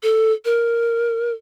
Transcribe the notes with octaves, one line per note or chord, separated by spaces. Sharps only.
A4
A#4